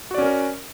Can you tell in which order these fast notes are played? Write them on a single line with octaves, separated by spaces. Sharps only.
F#4 D5 C#4 A#4